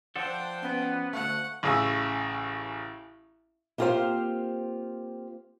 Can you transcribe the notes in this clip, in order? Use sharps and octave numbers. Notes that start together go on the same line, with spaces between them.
F3 D4 A4 C5 F#5 G5 F#6
B3 C#4
D2 A3 F5 F#5 A5
A1 C#3 G#4 E6
A#3 C4 F4 G4 C5 F5